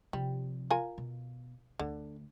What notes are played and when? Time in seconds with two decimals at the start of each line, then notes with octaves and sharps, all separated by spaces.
0.13 C3 F3 G3
0.70 F4 A#4 G#5
0.98 B2
1.79 D2 D3